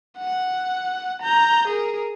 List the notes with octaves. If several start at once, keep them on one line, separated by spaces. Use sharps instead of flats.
F#5
A#5 G6
G#4 A#4